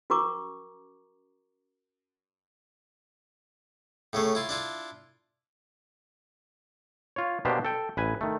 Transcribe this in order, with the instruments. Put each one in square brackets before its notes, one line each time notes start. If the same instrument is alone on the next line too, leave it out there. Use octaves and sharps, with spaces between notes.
[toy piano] C#4 F#4 A#4 A#5 C#6 D6
[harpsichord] A2 C#3 A3
E4 F4
D4 E4 F4
[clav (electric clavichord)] F4 C#5
B2 A#3 B3 D4 G4 C5
A4 G5
A1 B4 G#5
D#3 A3